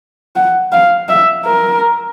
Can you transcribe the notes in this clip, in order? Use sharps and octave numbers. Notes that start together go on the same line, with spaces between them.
F#5
F5
E5
A#4